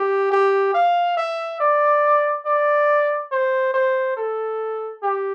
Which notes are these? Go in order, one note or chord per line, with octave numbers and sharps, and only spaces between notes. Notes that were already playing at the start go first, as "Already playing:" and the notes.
Already playing: G4
G4
F5
E5
D5
D5
C5
C5
A4
G4